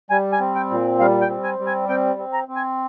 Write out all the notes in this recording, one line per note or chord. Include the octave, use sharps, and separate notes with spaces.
G3 G#5
G#5
C4
G5
A#2
G3 F5
G5
C4
G#5
G3
G#5
C4 G5
C4
A#5
C4
G#5